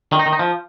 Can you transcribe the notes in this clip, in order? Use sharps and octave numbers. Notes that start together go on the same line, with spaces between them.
D#3
D#4
D#3
D#4
F3